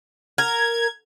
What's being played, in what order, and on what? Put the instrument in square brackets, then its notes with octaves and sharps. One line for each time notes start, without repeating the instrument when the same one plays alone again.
[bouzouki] A#4 [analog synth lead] G#6